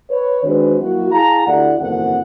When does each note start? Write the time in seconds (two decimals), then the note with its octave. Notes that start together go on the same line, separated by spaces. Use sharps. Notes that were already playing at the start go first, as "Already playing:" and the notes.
0.10 B4 C#5
0.44 D#3 G#3 C4 D4 F#4 B4
0.81 F#3 A#3 E4 F#4
1.12 E4 G#4 F5 A5 A#5
1.45 D2 E4 G4 A4 D5 F#5
1.78 F#1 E2 D#3 C4 A4 F#5